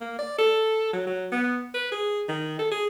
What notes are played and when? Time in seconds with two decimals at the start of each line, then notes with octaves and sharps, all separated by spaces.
0.01 A#3
0.18 D5
0.38 A4
0.93 F#3
1.07 F#3
1.32 B3
1.74 B4
1.92 G#4
2.29 D#3
2.59 A4
2.72 G#4